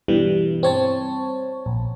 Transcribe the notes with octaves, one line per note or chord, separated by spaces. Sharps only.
G2 B2 E3 G3
C4 C#5 A5
A#1